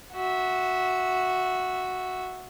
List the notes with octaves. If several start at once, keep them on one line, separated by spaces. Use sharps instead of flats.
F#4 E5